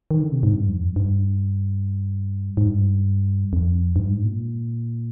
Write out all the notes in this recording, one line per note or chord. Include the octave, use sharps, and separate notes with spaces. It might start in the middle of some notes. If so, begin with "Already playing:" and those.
D#3
D3
C3
G#2
G2
F2
G2
G2
G#2
G2
F2
G2
G#2
A#2